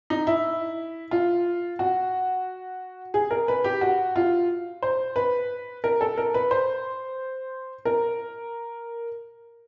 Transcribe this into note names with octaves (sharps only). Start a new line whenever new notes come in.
D#4
E4
F4
F#4
G#4
A#4
B4
G4
F#4
F4
C5
B4
A#4
A4
A#4
B4
C5
A#4